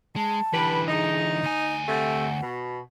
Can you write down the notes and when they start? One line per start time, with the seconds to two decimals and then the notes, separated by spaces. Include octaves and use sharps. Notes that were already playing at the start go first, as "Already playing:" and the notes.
0.16 G#3 A5
0.53 D3 E3 G4 B4
0.88 D#4 G#4
1.43 D2 D#5 G#5
1.87 C3 A3 F#5
2.42 B2